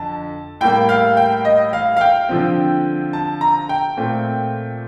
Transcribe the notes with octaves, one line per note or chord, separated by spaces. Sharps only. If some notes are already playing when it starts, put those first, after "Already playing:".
Already playing: F2 D3 A5
A2 G3 A#3 G5
F5
G5
D#5
F5
F5
G5
D3 F3 C4
A5
A#5
G5
A#2 A3 C4